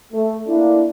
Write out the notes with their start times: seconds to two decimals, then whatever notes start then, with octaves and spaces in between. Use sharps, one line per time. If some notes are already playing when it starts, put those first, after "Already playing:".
0.13 A3
0.47 A#3 D4 E4